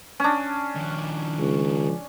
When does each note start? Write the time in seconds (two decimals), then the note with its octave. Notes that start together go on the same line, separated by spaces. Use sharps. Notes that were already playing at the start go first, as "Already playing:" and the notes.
0.20 C#4 D4
0.76 D#3 F3
1.39 C#2